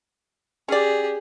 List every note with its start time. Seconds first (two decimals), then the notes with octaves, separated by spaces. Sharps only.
0.69 C#4 G4 G#4 D5